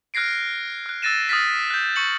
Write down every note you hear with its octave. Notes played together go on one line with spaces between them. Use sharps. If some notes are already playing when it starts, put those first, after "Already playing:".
F6 F#6 G#6 A#6 C7 D7
F6 F#6
E6 F#6 A6 A#6 D#7 E7
D#6 F6 A6 B6
F#6 G6
C#6 C#7 F#7